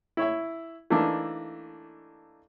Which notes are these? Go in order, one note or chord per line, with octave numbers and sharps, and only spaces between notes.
E4 C#5 E5
E3 A3 A#3 D4 D#4